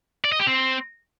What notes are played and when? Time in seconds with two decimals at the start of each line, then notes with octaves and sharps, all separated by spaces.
0.24 D5
0.32 D#5
0.40 G4
0.47 C4